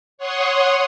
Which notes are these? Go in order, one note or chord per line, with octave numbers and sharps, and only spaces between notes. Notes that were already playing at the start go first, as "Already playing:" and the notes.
C#5 F#5 C6 C#6 D#6